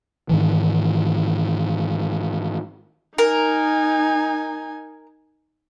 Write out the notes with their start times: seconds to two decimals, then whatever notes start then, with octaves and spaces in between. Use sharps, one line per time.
0.29 G#2 D#3 E3
3.18 D#4 A#4 G#5